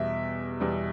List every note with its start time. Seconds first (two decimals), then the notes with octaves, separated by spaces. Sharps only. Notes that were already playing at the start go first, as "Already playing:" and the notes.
Already playing: E2 B2 G3 E5
0.60 E2 B2 G3